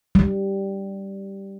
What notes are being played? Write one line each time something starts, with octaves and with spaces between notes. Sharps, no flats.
G3